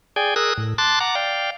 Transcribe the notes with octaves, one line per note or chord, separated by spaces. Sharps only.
G#4 D5 G5 G#5
G#4 A#4 D#6 E6 F#6
A2
A5 C6 D6 F#6 A6
F#5 A#5 D6
D5 F5 G5